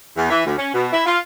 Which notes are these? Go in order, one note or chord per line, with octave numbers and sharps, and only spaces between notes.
E2
E3
D2
C#4
B2
E4
F4